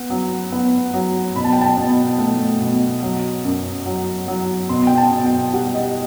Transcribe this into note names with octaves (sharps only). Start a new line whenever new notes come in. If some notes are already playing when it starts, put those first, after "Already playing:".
Already playing: B3
F#3
B3
F#3
B2 B5
A5
G5
A5
B2
A3
B2
F#3
F#2
F#3
F#3
B2 C6
G5
A5
B2
G5
G3 F#5
D#5